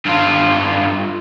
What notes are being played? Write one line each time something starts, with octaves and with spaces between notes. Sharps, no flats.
G2 F4